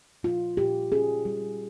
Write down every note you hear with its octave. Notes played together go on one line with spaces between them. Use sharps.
A#2 F4
A#2 G4
C#4 G#4
G3